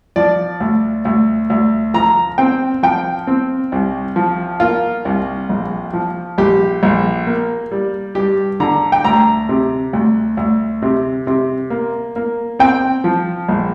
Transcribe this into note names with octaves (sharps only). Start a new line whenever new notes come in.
F3 D5
D2
D2
D2
F3 A#5
C4 G5
F3 G5
C4
C2
F3
A#3 F4
C2
A#1
F3
A#1 G4
A#1
A#3
G3
G2 G4
D3 A#5
G5
D2 A#5
C3
D2
D2
C3
C3
A#3
A#3
C4 G5
F3
A#1